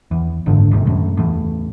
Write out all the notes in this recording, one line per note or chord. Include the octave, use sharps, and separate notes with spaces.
E2
F#1 G#2 D3
G1 D#2 C3
F#2 A2
E2 A2